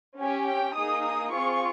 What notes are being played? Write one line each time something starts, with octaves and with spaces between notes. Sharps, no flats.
C#4 G4 G#5
G5
A#3 D#4 G#4 D#6
D#6
C4 F4 G#4 C#6